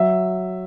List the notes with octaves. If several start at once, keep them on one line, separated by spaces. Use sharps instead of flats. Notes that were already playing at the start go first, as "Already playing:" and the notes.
Already playing: F#3 E5